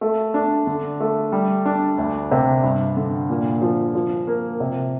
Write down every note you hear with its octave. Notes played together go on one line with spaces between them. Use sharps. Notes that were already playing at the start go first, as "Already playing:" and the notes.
A3
D4
D3
A3
G3
D4
D2
C3
G2
D3
A#2
F3
F3
A#3
C3